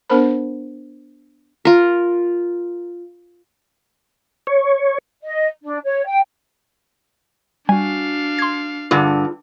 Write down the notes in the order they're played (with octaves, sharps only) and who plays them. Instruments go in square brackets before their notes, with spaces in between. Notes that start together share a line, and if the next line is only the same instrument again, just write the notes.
[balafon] B3 D4 A#4 C5 B5
[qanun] F4 A#4
[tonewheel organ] C#5
[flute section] D#5
D4
C#5
G5
[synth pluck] G3 [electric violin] D4 F5 [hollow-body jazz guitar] F#4 G#5
[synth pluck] C6 G#6
[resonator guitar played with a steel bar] G2 D3 [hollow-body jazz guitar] F4 G#4